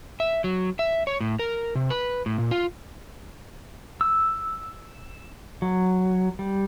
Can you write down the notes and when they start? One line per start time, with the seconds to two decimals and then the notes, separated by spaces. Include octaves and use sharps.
0.20 E5
0.44 F#3
0.79 E5
1.07 C#5
1.20 A2
1.39 A#4
1.75 C3
1.90 B4
2.26 A2
2.38 A#2
2.51 F4
4.01 E6
5.62 F#3
6.39 G3